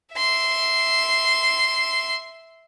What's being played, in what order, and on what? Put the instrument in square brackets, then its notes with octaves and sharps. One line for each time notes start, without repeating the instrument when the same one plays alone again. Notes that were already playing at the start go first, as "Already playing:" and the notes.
[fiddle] E5 C6